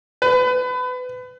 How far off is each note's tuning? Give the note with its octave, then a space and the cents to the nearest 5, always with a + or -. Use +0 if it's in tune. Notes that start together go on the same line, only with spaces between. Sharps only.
B4 +25